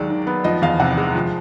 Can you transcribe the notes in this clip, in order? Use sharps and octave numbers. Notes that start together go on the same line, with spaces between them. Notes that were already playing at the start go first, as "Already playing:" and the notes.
Already playing: D#2 F#3 G#3 D5
D#3
B3
F3 D#5
E2 F5
C3 F#5
G#3
F3